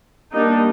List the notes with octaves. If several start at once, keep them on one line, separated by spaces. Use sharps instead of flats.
G3 A#3 D4 D#4